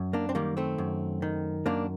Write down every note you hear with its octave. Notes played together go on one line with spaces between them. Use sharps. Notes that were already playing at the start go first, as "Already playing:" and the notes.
Already playing: F#2
A#3 D4
C4
D#3 G3 A#3
A3 C4
F#2
D#3
F#2 A#3 D4